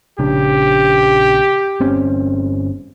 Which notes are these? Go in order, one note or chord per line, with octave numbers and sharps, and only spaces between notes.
A#1 C#3 D4 G4
G1 C4 C#4